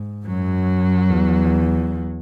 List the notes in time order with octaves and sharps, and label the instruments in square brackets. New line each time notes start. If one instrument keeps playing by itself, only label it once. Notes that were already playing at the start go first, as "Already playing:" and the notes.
Already playing: [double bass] G#2
[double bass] F#2 [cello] F#3
[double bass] E2